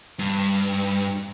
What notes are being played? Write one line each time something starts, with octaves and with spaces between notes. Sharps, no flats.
G2